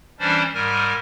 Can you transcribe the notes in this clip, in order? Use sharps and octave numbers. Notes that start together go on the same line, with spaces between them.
E3 G3 C#4 D4 C5 D5
G#2 G3 A#4 G#5